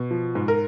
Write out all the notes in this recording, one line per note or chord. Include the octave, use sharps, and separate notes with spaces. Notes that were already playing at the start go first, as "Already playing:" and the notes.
Already playing: B2
F3
G#2
A#4